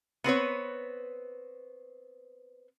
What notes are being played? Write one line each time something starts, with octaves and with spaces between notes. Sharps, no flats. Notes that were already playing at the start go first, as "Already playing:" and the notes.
B3 C4 B4 C#5